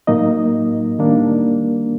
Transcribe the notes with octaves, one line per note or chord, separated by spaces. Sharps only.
A2 F#3 A#3 D#4 D#5
D#3 G3 A#3 D4